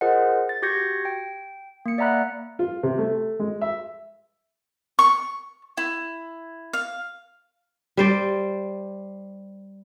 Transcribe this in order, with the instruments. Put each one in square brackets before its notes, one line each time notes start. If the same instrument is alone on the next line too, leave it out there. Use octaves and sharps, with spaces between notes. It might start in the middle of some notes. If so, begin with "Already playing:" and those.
[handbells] F4 G#4 A#4 C5 D#5 F#5
A6
F#4 G4 G6 G#6 A#6 C#7
G5
A#3 C#7
D5 E5 F#5 A#5 B5 F#6
[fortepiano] F4
C3
A3
G#3
E5
[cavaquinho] C#6
E4
F5
[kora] G3 C5 D5